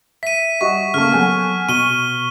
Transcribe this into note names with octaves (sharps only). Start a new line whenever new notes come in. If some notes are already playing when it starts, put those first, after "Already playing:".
E5 B6 D#7
G3 F#4 D#5 C#6
C#3 A3 A#3 C#6 F6
F#3 B3 A4 F#5 G#5
B2 C#6 D#7 G7